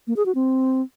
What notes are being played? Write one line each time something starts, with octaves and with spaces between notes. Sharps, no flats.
A#3
G#4
F#4
C4